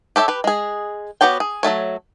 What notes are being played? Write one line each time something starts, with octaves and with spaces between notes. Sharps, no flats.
G4 A4 C#5 E5
G4 B4
G#3 G#4
B3 F#4 G4 C#5 G5
G#4
F#3 G#3 A3 C#5